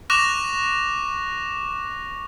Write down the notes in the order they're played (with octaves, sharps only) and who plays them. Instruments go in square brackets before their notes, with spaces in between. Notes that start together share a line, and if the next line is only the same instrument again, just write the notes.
[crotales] C#6 D6 F#6 A#6 E7 F7